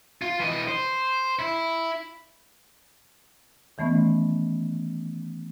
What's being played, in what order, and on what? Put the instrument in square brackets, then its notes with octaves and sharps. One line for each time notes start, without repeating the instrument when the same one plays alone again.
[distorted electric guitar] F4
E3 D#5
C5
E4
[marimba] D#3 E3 A3 B3 C#4